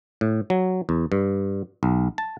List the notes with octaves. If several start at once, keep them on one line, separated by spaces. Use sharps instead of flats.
A2
F#3
E2
G2
B1
A5